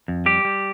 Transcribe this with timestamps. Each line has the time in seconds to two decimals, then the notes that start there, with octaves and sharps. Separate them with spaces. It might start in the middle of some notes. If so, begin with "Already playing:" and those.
0.08 F2
0.26 G3 G4
0.45 G3